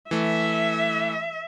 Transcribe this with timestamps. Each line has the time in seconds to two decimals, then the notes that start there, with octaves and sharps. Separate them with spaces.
0.11 E3 A3 E5